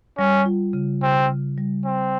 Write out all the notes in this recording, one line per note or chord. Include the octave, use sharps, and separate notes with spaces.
G3 C#4
F4
C#3
C#3 C4
C#3
G3
C#3 C4